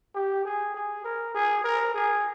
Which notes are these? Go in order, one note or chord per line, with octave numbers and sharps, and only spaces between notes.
G4
G#4
G#4
A#4
G#4
A#4
G#4